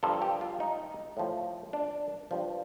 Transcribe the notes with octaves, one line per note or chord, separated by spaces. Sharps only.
G2 F3 A4
G4
F4
D#4
A2 F3
D4
G2 F3